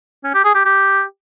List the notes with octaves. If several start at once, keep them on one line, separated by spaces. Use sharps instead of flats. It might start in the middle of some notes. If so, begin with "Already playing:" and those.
C#4
G4
G#4
G4
G4